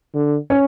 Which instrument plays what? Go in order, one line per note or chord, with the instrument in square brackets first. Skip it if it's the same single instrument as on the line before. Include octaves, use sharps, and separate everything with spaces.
[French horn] D3
[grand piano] C#4 C#5